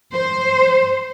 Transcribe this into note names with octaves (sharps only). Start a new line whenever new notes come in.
C5